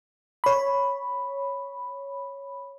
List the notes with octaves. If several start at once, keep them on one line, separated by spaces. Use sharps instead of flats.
C#5 B5